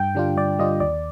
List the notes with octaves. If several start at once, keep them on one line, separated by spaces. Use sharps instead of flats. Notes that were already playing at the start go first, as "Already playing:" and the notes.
Already playing: G2 G5
D3 G3 D4 F4
G2 D5
D3 G3 D4 F4 D#5
D#2 D5